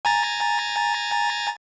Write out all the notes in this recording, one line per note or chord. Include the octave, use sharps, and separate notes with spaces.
G#5 A#5 A6